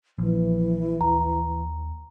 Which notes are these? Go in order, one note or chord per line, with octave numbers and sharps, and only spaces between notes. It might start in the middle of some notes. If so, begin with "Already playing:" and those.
A#1 E3 F3
D#2 A#5